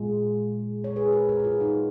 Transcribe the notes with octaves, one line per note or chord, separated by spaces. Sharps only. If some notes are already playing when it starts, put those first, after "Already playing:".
Already playing: A#2 G#3 F4 G#4
C#5
G#4 B4
F#4 A#4
F#4 A#4
F#4
F4 G#4
D#4 F#4